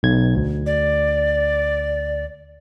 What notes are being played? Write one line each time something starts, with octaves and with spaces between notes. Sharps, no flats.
B1 G#6
D2
D5